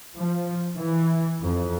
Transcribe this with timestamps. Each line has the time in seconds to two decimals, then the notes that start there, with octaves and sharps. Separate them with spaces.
0.18 F3
0.77 E3
1.42 F2